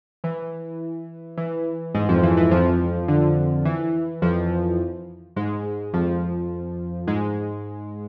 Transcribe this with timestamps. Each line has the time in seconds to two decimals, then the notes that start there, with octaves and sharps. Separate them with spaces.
0.24 E3
1.38 E3
1.95 G#2 G#3
2.09 F2 F3
2.23 E3
2.37 E3
2.51 F2 F3
3.08 D3
3.65 E3
4.22 F2 F3
5.36 G#2 G#3
5.93 F2 F3
7.07 G#2 G#3